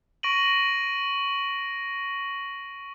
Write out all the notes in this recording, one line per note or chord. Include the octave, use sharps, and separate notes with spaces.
C#6 A#6 D7 D#7 F#7